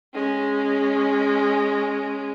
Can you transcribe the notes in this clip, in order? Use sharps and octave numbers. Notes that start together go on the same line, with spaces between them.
G#3 C#4